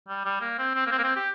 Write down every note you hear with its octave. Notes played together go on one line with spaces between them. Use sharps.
G3
G3
A#3
C4
C4
A#3
C4
A#3
C4
G4